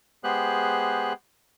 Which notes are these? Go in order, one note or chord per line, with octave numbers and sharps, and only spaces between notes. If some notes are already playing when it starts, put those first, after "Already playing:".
G#3 B3 G4 G#4 C5 F#6